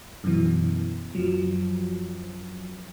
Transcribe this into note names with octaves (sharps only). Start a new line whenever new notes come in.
F#2 B2 E3
F#2 F3 F#3